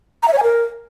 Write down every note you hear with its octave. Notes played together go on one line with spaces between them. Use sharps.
A#5
E5
C#5
G#5
A#4